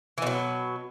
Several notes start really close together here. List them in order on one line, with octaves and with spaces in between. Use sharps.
E3 B2 F#3